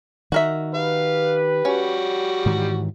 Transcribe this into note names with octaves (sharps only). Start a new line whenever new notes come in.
D#3 F#4 A#4 E5
G4 B4 F5
G3 C#4 F#4
G#2 D#3 E3